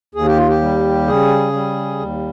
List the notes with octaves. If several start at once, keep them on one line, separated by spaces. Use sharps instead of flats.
D#2 G#4
G4
F4
G4
G3
C#3 G#4
G3
D#2